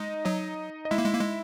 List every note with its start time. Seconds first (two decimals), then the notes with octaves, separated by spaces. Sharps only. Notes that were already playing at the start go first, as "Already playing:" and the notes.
Already playing: G#3 D#4 D#5
0.25 F#3 D#4 D#5
0.85 D#5
0.91 G#3 E4 E5
0.98 A#3
1.05 G#3
1.13 A#3
1.21 G#3